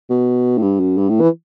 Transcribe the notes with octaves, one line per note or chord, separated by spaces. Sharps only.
B2
A2
G2
F#2
G2
A2
E3